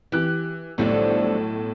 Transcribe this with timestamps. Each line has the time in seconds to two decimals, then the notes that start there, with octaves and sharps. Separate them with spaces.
0.12 E3 G4 F#6
0.78 B1 A2 D3 F3 G3